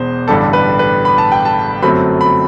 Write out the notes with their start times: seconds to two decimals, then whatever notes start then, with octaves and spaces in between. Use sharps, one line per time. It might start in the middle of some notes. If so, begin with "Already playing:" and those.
Already playing: E1 E2 C5
0.28 A1 G2 D3 G3 A4
0.53 B4
0.79 B4
1.05 B5
1.18 A5
1.32 G5
1.45 A5
1.82 G1 F#2 F#3 A3 C4 B5
2.21 B5